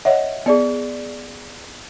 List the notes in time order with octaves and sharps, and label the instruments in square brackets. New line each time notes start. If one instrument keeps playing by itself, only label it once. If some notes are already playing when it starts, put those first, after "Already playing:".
[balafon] C#5 D#5 F#5 [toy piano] E5
[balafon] B3 [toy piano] G#4 D5 G5